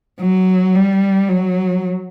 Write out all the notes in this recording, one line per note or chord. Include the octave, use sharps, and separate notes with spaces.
F#3
G3
F#3